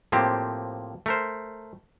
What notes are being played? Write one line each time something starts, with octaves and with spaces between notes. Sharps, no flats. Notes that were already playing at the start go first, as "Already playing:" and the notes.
A2 F3 A#3 C4 G4
A3 A#4 C5